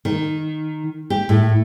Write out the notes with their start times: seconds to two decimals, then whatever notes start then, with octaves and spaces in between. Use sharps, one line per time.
0.05 D#3
1.10 G4
1.29 A2